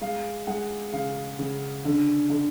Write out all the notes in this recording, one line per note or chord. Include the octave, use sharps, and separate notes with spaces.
G#3 F5
G#3 F#5
C#3 F5
C#3
D3
D3